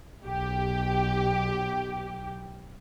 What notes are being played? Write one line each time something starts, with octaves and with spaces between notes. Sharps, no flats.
B1 G4